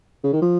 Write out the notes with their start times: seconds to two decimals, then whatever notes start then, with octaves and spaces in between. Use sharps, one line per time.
0.24 C#3
0.33 D#3
0.42 F3